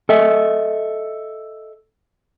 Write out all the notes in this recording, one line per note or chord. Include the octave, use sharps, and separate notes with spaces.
A4 D#5 E5